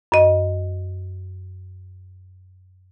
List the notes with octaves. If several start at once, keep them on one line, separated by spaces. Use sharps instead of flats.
F#2 D#5